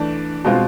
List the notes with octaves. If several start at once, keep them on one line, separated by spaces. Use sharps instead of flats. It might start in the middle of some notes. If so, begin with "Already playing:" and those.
Already playing: E3 A3 D4
B2 G#3 C4 F4